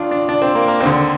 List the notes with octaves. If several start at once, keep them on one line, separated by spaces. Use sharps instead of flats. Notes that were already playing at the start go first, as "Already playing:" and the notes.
Already playing: D#2 D4 F4
D4
D4
C4
A#3
A#3
D#2 C4
D3